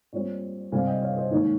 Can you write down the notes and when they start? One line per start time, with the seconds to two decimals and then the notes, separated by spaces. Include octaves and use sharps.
0.13 A#2 G3 C4 C#5
0.72 C3 G3 C4 F5 G#5
0.86 D#5 G5
1.01 C#5 F5
1.16 C5 D#5
1.31 G#2 D#3 A#3 C#4 C#5